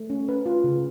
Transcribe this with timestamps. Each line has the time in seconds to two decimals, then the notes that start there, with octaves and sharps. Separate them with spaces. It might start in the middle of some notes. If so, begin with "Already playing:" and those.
Already playing: A3
0.10 C#4
0.29 B4
0.46 F4
0.64 C#3